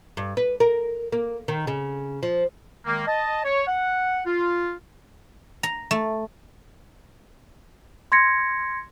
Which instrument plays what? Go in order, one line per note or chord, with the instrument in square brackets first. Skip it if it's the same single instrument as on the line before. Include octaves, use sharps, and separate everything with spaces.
[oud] G2
B4
A#4
A#3
D#3
C#3
F3
[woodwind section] D#3 G#3 A#3
D#5 A5
C#5
F#5
F4
[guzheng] A#5
A3
[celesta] C6 G#6 A#6 C#7